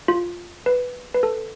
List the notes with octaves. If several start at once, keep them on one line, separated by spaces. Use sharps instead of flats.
F4
B4
B4
A4